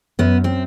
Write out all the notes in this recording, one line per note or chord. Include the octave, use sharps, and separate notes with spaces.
F#2 B3
C4